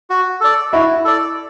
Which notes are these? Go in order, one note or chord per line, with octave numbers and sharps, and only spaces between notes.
F#4
A4 D5
E4 F#4
A4 D5